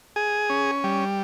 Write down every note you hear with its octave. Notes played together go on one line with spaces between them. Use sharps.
G#4
C#4
G3